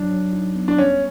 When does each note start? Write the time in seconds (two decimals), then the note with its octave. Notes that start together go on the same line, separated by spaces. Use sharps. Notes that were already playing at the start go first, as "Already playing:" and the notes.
Already playing: F#3 D4
0.11 F#3
0.33 D#4
0.55 B3
0.68 D4
0.78 G3 C#4